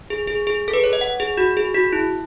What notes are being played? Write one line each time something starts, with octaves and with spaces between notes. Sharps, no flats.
G#4
G#4
G#4
A4
B4
C#5
D#5
F#5
G#4
F#4
G#4
F#4
E4